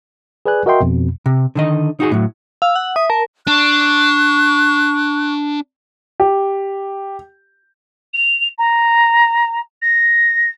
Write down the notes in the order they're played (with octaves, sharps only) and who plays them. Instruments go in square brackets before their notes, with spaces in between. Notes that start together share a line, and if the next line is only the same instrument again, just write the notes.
[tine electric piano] G#4 B4 D5 G#5 F#6
F#4 A#4 D#5 E5 G5 C6
F2 B2
[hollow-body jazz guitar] C3
D3 D#3 D#5
D#4 F#4 G#4
A2 F#3
[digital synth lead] F5 [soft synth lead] E6
[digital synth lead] F#5
[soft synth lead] E5 [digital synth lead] D#6
[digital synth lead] A#4 [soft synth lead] A5
[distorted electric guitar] D4 [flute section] C#6 F#6
[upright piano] G4
[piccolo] F7
A#5
A#6